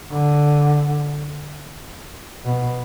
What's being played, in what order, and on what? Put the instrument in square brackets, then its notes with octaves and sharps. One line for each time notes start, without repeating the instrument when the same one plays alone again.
[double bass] D3
B2